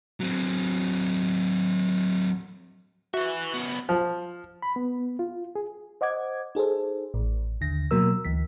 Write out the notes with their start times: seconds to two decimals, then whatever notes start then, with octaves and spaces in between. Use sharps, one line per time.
0.20 F#3 C4
3.14 F#4 B4 E5
3.54 C#3 B3
3.89 F3
4.62 B5
4.76 B3
5.19 F4
5.55 G#4
6.01 C5 D#5 F#5 D6 G#6
6.55 D#4 G#4 A4 C5
7.14 A1 A2
7.61 D#2 D3 A#6
7.91 B2 F#3 A#3 A#4 E6
8.25 D2 E3 B6